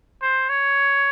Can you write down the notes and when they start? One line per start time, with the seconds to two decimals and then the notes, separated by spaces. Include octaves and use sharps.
0.22 C5
0.49 C#5